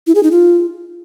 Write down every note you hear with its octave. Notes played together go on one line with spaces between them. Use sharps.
E4
G#4
D#4
F4